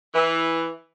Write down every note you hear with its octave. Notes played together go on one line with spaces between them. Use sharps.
E3